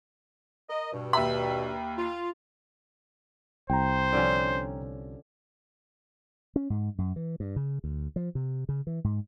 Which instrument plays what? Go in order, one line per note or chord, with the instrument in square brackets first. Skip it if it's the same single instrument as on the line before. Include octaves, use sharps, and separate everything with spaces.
[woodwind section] A#4 D#5
G2 B2
[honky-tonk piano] D#2 E5 B5
[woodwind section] F4
[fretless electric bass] C2 [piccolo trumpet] C5 [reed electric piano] G5 A#5
[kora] D3 F3 C#4
[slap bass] C#4
G#2
F#2
E3
G2
C#3
D2
F3
C3
C#3
E3
G#2